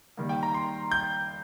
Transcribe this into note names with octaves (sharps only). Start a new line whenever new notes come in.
D#3 G3 A#3
G5
A#5
C6
G6